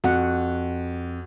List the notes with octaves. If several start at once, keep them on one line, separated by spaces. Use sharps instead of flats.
F2 F#4 F#5